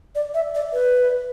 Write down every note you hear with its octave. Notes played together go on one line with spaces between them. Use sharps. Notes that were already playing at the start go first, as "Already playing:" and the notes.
D5
E5
D5
B4